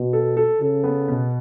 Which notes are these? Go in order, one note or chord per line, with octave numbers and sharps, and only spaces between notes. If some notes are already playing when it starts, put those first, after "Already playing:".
Already playing: B2
A4
A4
C#3 A4
B3
B2